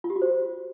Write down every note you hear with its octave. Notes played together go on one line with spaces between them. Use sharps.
F4
G4
F#4
C5